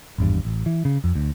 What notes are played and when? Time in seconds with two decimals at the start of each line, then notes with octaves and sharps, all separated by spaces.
0.18 G#1 E2 G2
0.45 A1
0.66 E3
0.85 C#3
1.04 F2
1.15 D2